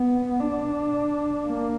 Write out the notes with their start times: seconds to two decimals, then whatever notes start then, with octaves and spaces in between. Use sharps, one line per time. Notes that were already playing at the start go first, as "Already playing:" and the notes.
Already playing: B3
0.40 D4
1.47 A#3